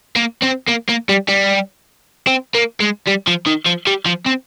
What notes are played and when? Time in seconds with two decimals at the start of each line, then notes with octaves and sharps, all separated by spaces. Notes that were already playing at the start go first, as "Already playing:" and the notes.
0.16 A#3
0.43 C4
0.69 A#3
0.89 A#3
1.09 G3
1.29 G3
2.27 C4
2.54 A#3
2.80 G#3
3.07 G3
3.27 F3
3.47 D#3
3.66 F3
3.87 G3
4.06 F3
4.26 C4